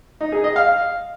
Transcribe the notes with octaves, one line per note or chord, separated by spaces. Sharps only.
D#4
G#4
D#5
F5